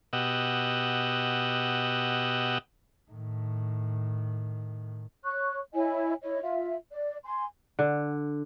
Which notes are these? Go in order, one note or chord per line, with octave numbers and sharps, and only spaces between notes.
B2 G4 D#5 F#5 E6
A2 D#3
C#5 C#6 F#6
E4 C#5 D#5 G#5
E4 C#5 D#5
F4 E5
D5
G#5 C6
D3